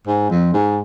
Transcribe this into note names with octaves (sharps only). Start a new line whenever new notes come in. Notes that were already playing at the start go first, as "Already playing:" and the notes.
G#2
F2
G#2